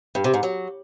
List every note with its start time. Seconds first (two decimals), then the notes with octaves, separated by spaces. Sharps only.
0.15 G2
0.24 C3
0.34 G#2
0.43 F#3